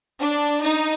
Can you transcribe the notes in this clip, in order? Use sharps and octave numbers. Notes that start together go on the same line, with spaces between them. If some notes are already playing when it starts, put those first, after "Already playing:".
D4
D#4